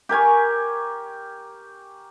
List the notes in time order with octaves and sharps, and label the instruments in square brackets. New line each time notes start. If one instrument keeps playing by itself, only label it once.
[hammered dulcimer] G4 A#4 G#5 C#6